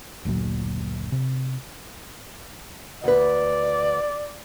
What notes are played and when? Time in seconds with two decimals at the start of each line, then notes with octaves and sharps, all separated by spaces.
0.25 F#1 D2 A#2 F#3
1.12 C3
3.04 D2 B4 D5